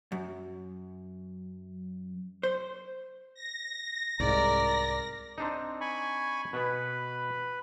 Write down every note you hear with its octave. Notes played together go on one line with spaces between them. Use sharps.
F#2
C5
A#6
C2 G#2 A#4 D5
C4 D4 D#4
G#5 B5 C#6
B2 B3 B4